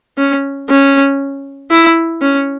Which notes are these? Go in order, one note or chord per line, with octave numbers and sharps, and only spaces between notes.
C#4
C#4
E4
C#4